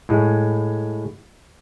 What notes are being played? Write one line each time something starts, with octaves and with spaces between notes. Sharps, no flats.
A2 G#3